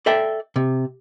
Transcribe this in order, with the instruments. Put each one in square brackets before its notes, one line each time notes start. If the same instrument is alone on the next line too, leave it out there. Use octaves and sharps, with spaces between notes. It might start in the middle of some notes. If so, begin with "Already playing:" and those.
[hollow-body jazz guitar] A4 D5 E5 G5
C3